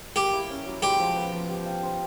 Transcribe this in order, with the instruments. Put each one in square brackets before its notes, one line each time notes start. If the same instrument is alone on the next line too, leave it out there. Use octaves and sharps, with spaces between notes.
[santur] A#3 [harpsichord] G4
[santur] E4
C#4
F#3
[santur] G#3 [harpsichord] G4
[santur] F3
B3
F3
G4
F5
C5